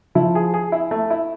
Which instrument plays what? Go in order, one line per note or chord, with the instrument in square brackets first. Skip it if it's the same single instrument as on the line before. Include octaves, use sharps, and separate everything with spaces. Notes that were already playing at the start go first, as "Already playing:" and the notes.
[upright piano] F3 [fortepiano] E4
[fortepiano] G#4
G#4
E4
A3
E4